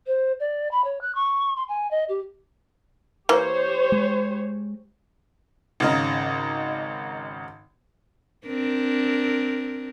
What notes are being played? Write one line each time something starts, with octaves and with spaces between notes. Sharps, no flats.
C5
D5
B5
C#5
F#6
C#6
C6
G#5
D#5
G4
E3 A#3 G4 C5 C#5
G#3
G#1 C#3 D#4
C4 D4 A#4